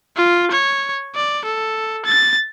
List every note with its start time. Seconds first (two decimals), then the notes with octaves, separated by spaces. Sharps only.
0.17 F4
0.51 C#5
1.15 D5
1.45 A4
2.06 A6